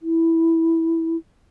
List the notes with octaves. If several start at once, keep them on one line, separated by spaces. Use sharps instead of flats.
E4